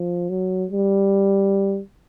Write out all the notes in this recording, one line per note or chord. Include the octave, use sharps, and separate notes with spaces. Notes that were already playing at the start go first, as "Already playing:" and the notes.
Already playing: F3
F#3
G3